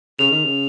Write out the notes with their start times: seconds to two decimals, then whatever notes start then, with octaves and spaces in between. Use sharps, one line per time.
0.19 C#3 F7
0.31 D#3
0.44 C#3